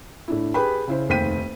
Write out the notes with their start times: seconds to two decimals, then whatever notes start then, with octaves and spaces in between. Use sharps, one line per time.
0.28 A2 D4 E4
0.54 G4 G#4 B4 G5 B5
0.88 C#3 E4 C5
1.09 F1 D#2 C5 G5 B6 D#7